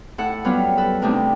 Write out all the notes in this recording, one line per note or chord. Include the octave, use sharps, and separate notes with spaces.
A2 A4 F#5
F#3 G3 B3 C#4 F4 B4
A4 B4
E2 C3 A3 D4 D#4 G6